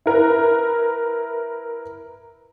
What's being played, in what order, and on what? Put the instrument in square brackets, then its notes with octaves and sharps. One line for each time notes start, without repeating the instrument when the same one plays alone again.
[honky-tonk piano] E4 A#4 B4